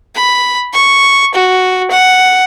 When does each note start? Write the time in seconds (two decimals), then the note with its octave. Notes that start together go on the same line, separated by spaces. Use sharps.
0.15 B5
0.73 C#6
1.34 F#4
1.90 F#5